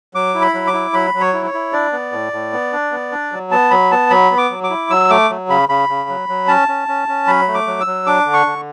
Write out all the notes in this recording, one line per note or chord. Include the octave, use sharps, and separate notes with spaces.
F#3 D6
E4
B5
F#3
D6
E4
F#3 B5
F#3
C#5
E4
C#5
E4
D4 D5
B3
A2
A2
B3
D4
B3
D4
F#3
B3 A5
F#3 B5
B3 A5
F#3 B5
B3
D6
F#3
D6
E4
F#3 E6
A3 D6
F#3
C#3 B5
C#3 B5
C#3
F#3
F#3
C#4 A5
C#4
C#4
C#4
F#3 B5
A3
D6
F#3
E6
F#3
D4 D6
D3
C#6
D3